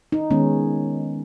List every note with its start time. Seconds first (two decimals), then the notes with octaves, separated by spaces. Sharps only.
0.12 D#4
0.31 D#3 G#3 B3 C#4